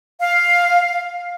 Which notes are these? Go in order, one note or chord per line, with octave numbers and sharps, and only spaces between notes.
F5